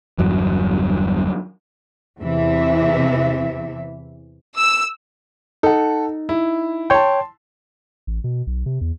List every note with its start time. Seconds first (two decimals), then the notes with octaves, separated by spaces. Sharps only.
0.18 G1 E2 G2 F#3
2.19 E2 C3 E3 E5
4.59 E6
5.63 D#4 A4 F#5
6.29 E4
6.90 C#5 G5 A5 C6
8.07 A1
8.24 B2
8.47 B1
8.66 C3
8.81 E2